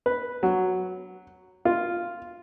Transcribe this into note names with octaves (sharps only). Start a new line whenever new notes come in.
B4
F#3
F4